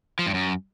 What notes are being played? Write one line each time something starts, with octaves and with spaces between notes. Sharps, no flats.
F3
G2
F#2